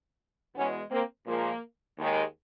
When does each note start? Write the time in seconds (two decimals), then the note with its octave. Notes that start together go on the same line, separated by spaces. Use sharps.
0.55 E2 B2 G#3 B3 C#4
0.90 A#3 C4
1.27 A#2 F3 G#3 A#3
1.98 D#2 D#3 G#3